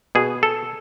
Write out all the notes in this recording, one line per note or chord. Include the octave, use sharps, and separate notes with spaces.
B2 G#4
A4